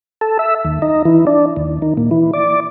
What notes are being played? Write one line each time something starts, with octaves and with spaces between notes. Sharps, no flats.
A4
E5
D#2
D#4
E3
D4
D#2
D#3
A#2
E3
D5